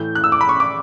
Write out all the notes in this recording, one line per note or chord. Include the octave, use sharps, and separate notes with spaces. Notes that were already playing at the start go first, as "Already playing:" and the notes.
Already playing: A2 E3 A3 G6
F#6
E6
D6
B5
C#6
D6